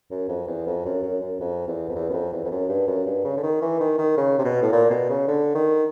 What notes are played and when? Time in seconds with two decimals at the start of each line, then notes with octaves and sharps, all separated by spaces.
0.11 F#2
0.29 F2
0.47 E2
0.67 F2
0.85 F#2
1.03 F#2
1.21 F#2
1.40 F2
1.67 E2
1.89 F2
1.95 E2
2.09 F#2
2.13 F2
2.32 E2
2.44 F2
2.51 F#2
2.69 G2
2.87 F#2
3.06 G2
3.24 C#3
3.37 D3
3.43 D#3
3.62 E3
3.80 D#3
3.98 D#3
4.17 C#3
4.38 C3
4.44 B2
4.62 A2
4.72 A#2
4.90 B2
5.10 C#3
5.28 D3
5.55 D#3